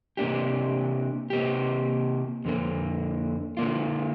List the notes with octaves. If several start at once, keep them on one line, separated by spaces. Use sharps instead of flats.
C3 A#3 D4 G4
C3 A#3 G4
F2 D3 A#3
D3 A#3 F4